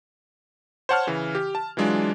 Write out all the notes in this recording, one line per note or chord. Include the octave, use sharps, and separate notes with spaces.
C5 C#5 F#5 A5 C6 F6
C#3 E3
G4
A5
E3 F#3 G#3 D4 F4